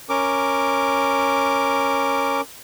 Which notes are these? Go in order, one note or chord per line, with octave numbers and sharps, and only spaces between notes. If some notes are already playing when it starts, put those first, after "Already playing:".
C#4 A#4 D6